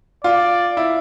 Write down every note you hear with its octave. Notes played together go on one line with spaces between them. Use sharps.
F4 D5
E4